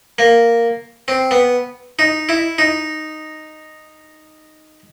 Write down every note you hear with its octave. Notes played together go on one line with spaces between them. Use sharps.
A#3
C4
B3
D#4
E4
D#4